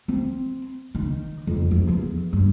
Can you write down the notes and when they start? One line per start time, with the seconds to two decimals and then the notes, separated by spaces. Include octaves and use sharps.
0.08 C4
0.95 D#3
1.47 F2
1.71 F3
1.88 E2
2.33 G2